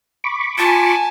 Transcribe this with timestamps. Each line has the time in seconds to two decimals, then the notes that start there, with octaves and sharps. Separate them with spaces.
0.24 B5 C#6 D6
0.58 F4 G#5 A5